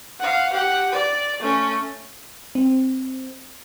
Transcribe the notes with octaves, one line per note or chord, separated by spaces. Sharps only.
F5 F#5
G4 F#5
D5
A3 C#4
C4